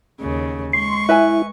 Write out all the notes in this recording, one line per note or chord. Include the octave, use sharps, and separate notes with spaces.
D#2 C#3
G#3 C6 C#6
E4 B4 E5 G#5